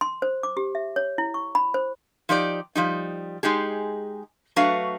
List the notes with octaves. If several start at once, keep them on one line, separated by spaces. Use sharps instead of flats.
C6
C5
D6
G4
E5
C#5
E4
C#6
B5
C5
F3 D#4 G4 D5
F3 G3 D#4
G#3 D#4 G4 G#4
F#3 A3 D4 F#4 B4 F5